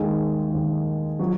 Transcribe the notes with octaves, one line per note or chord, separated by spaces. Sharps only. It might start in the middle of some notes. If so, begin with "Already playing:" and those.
Already playing: D#2 D#3 G#3 G#4
D#2 D#3
F3 F#3 F#4